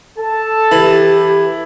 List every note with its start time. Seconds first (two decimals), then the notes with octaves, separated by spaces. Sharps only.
0.18 A4 A5
0.71 E3 E4 G4